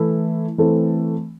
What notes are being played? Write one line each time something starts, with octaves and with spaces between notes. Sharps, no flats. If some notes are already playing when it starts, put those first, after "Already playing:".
Already playing: E3 A3 E4
E3 A3 C4